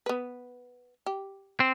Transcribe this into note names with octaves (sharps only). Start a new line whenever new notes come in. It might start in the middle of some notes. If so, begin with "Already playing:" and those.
B3 B4
G4
C4